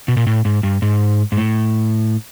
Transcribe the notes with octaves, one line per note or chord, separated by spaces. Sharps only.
B2
A#2
A2
G#2
G2
G#2
G#2
A2